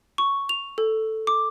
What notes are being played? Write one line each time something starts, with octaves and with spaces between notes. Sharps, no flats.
C#6
F7
A4
D6